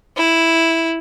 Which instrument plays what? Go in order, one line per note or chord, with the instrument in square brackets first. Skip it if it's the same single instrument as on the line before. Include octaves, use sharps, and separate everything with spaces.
[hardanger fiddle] E4